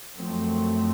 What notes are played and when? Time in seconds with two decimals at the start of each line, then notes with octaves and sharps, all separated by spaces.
0.15 F#2 F3 A3 C4